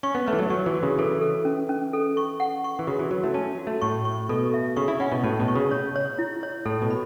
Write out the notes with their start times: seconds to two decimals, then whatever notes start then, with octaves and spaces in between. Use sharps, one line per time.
0.03 C#4 C#6
0.15 B3
0.27 A3 B4
0.33 E3
0.39 F#3
0.50 F#3 C#6
0.66 E3
0.74 F#4
0.83 C#3
0.99 E3 A4
1.21 A4
1.45 C#4
1.69 C#4
1.93 A4
2.17 C#6
2.40 F#5
2.64 C#6
2.79 E3
2.87 C#3 F#4
2.99 E3
3.11 F#3 F#4
3.24 A3
3.34 C#4 A5
3.59 F#4
3.67 A3
3.82 A2 C#6
4.05 C#6
4.29 B2 A4
4.54 E5
4.76 C#3 C#6
4.88 E4
5.00 C#4 F#5
5.12 B2
5.24 A2 A5
5.40 B2
5.48 C#6
5.55 C#3
5.71 C#5
5.96 C#5
6.19 E4
6.43 C#5
6.66 A2 A4
6.82 B2
6.90 B5